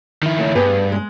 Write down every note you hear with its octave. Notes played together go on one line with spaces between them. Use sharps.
D#3 E4
C#3 A3
G2 B3 G#4 B4
G#3 G#4